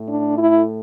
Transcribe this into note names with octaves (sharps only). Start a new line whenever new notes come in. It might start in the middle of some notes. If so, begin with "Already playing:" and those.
Already playing: A2 A3
D4
E4